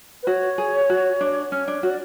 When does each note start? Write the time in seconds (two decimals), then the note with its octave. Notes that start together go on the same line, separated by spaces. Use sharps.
0.23 B4
0.27 F#4 C#5
0.58 G#4
0.90 F#4
1.21 D4
1.51 C#4 C#5
1.68 D4
1.83 F#4 C#5
1.90 D5